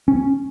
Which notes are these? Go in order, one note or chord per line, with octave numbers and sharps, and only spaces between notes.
C#4